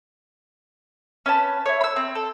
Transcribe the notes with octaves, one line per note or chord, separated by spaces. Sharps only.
C#4 B4 A5
E4 C#5
B5 E6
C4
A4